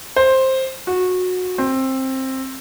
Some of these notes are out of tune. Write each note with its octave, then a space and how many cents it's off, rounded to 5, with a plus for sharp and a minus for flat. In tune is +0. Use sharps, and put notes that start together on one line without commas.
C5 +10
F#4 -20
C4 +15